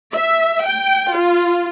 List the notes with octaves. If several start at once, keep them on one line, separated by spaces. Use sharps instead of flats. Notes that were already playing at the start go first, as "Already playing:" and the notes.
E5
G5
F4